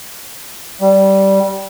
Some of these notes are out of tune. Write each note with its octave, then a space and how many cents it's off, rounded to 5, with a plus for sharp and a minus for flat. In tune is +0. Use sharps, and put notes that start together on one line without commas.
G3 -15